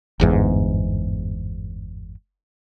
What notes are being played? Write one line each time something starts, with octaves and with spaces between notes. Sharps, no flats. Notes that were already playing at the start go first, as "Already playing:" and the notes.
G1 E2 G#2